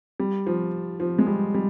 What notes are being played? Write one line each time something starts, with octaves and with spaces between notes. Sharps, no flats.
G3
F3
F3
G#3
G3
G3